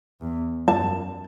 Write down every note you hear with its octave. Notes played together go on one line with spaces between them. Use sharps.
E2
F#2 A5